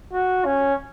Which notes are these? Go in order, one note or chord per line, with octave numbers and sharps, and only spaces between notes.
F#4
C#4